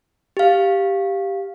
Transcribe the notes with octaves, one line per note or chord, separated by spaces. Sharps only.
G4 F5